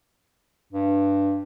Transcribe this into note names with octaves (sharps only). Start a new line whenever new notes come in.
G2